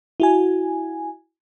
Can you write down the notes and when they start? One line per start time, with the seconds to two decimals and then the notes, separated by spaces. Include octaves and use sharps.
0.20 E4 F#4 G#5